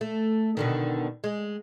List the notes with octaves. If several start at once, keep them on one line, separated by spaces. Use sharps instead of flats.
A3
B2 D3 D#3
G#3